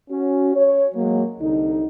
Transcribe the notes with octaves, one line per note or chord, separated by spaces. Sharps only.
C#4 F#4
C#5
F#3 G#3 A#3
C2 D3 D#4